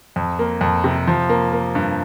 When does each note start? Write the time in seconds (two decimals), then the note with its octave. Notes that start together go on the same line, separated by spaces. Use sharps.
0.16 F2
0.39 A#3
0.61 F2
0.84 C3
1.07 F3
1.29 A#3
1.53 A#3
1.75 G2